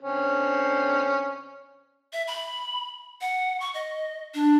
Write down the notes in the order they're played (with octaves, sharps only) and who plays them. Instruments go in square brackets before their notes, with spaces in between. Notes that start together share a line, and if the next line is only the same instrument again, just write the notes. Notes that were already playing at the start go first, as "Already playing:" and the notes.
[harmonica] D3 C4 C#4
[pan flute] E5
B5
F#5
C#6
D#5
D4